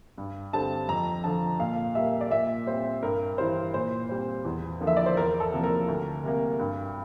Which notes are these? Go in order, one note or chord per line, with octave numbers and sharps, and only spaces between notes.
G2
D3 G3 C4 A5
F2 A#5
D3 F3 A5
A#2 F5
G3 A#3 E5
D5
A#2 E5
G3 C4 C5
G2 A#4
E3 G3 C5
A#2 C5
G3 C4
E2
D3 F3 A#3
E5
D5
C5
E2 A#4
A4
C3 F3 A#3
A#4
D2
C3 G3 A#3
G2